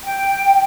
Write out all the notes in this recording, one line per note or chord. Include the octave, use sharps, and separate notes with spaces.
G5